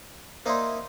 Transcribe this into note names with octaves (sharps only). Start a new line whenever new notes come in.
A#3 D#4 E4 C5 D5 C6